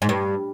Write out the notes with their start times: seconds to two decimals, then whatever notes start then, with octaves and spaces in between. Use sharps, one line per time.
0.02 G#2
0.09 G2